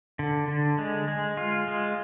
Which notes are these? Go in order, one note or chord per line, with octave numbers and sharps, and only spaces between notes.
D3
D3
G#3
G#3
F4
G#3